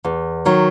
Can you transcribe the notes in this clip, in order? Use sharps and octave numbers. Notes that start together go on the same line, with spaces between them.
E2
D#3 F#3